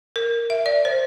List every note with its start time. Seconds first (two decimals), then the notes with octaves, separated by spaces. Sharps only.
0.16 A#4
0.50 E5
0.66 D5
0.85 C5